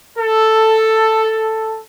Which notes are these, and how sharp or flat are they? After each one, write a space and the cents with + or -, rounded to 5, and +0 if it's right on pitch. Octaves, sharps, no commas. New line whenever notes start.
A4 +5